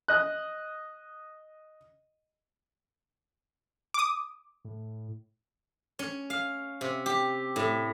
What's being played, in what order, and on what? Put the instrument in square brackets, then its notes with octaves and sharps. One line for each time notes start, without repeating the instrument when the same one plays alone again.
[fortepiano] D#5 F#6
[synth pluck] D6 D#6
[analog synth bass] A2
[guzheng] C#4
F5
C3
G4
A2